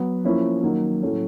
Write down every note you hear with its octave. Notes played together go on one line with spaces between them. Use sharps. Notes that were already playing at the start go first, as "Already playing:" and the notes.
Already playing: F#3 B3
F3 A#3 C#4 E4
D#3 F#3 A#3
A2 F#3 A3 C#4